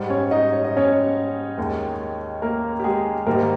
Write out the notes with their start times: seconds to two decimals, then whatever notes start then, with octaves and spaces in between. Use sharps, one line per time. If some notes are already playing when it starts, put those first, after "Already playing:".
Already playing: G#2 G3
0.10 C#4 C#5
0.31 D#4 D#5
0.53 C#5
0.64 D#5
0.77 C#4 C#5
1.58 D#2 D#3 G#3
2.42 A#3 A#4
2.80 G4
2.84 G#3 G#4
3.26 G#2 D#3 G3 A#3 A#4